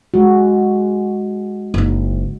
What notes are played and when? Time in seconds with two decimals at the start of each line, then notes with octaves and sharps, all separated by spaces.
0.14 G#3 F#4
1.74 F#1 D#4